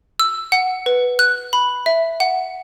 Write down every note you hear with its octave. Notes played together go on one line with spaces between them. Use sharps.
E6
F#5
B4
F#6
B5
E5
F#5